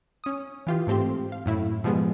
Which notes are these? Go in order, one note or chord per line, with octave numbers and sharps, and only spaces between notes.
C#4 D#6
E3 F4 G4
G#2 A3 C4 G4 C6
F5
F#2 A2 E4
B2 F3 G3 G#3 B3 G#4